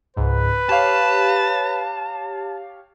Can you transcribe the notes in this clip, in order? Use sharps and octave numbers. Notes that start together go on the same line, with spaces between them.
C#2 G#2 B4
G4 C#5 F5 A5